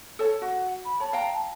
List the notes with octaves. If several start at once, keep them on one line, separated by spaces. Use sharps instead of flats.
A4 C#5 A5
F#4 F#5
B5
C#5 A5
F5 G5 A#5